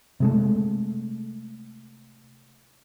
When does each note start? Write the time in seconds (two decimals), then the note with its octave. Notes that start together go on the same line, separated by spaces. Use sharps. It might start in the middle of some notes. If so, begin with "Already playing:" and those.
0.20 C3 G#3 A3